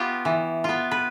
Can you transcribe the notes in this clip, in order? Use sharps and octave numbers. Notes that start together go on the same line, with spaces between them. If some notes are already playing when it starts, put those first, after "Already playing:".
Already playing: B3 F4 G4
E3
B3 F4
B4